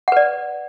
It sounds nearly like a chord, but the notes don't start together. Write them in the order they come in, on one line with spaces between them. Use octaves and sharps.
F#5 B4 D5